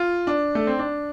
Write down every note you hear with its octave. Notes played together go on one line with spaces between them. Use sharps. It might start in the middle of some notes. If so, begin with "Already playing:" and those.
Already playing: F4
D4
A3
C4
D4